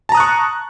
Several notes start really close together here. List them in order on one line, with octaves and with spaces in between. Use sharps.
A5 A#5 D#6 F#6 C#6